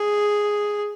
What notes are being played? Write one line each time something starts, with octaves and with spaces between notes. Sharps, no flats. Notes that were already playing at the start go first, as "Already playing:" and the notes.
Already playing: G#4